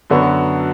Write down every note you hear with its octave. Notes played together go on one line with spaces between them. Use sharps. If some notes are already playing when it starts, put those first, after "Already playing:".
F#2 D3 F#3 B3 F#4